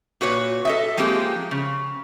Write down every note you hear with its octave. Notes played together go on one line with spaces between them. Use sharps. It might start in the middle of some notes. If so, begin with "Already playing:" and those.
A#2 F#4 B4 C#5
A4 D#5 E5
F3 G#3 A#3 C4 G4 G#4
C#3